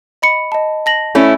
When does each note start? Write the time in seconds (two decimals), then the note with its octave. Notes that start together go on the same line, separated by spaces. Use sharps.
0.22 D#5 B5 C#7
0.52 D#5 A5
0.86 A5 A#6 F#7
1.15 A3 C#4 E4